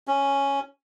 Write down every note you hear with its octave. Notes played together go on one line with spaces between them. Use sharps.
C#4